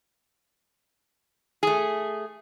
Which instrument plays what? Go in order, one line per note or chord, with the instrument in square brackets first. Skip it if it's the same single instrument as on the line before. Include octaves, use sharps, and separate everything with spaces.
[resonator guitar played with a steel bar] A3 G#4